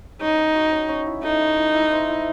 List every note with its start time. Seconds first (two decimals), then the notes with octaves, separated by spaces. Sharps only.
0.21 C#4 D#4
0.38 C#4
0.55 F#4
0.72 C#4
0.89 C#4
1.06 E4
1.23 D#4 A4
1.40 E4
1.56 E4
1.74 E4
1.91 C5
2.08 E4